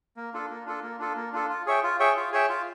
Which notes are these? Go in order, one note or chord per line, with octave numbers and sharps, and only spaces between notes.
A#3
D4 F4 A4
A#3
D4 F4 A4
A#3
D4 F4 A4
A#3
D4 F4 A4
F4
G#4 C#5 E5 G5
F4
G#4 C#5 E5 G5
F4
G#4 C#5 E5 G5
F4